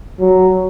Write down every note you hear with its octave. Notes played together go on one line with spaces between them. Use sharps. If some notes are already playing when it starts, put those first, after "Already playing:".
F#3